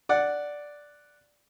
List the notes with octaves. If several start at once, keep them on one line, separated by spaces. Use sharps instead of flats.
D5 F#5